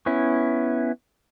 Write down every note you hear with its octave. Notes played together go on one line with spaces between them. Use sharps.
B3 C#4 E4